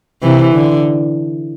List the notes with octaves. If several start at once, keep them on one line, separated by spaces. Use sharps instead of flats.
C3 E3
D3